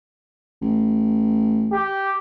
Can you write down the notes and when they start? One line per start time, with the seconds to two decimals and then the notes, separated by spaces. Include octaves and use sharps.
0.62 A1
1.73 G4